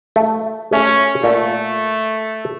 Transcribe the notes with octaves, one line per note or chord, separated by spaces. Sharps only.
A3
A3 C#4
A#2 A3